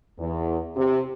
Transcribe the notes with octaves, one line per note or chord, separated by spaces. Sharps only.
E2
C3